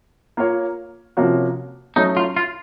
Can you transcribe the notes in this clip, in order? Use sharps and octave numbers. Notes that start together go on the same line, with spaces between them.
A#3 F4 A#4 C#5
C3 F3 A#3 C#4 F#4
F#3 A3 C#4 D#4
F4
F4